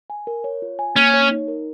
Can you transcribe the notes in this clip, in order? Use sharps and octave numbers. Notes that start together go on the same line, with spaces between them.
G#5
A#4
C#5
F4
G#5
A#3 C#4
C#5
D#4
A#4